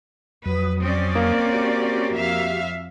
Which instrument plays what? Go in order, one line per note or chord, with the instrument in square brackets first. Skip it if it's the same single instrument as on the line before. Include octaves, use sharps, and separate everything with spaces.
[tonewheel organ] F2 F#3 D#6 [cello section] B4
[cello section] C4 C#4 D5
[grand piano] A#3
[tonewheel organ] F#4 G4
[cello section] F2 E5 F5